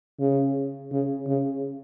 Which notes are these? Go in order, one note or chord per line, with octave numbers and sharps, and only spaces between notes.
C#3
C#3
C#3